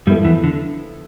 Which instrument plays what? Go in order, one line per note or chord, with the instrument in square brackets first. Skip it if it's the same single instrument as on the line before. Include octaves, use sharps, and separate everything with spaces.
[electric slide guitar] G2 G3 [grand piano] F3 B3 E4 A4
[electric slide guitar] E2 E3
D3